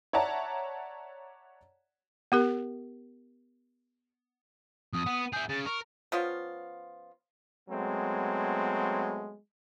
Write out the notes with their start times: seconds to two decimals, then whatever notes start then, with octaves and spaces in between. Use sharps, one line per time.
0.13 C#5 D5 E5 F#5 A5 A#5
2.32 B3 G4 A#4
4.93 F2 D#6
5.06 B3
5.33 E4 G#4 G6
5.49 C#3 A6
5.66 A#4 C#6
6.12 F3 B3 C#4 F4
7.69 F#3 G#3 A3 B3 C4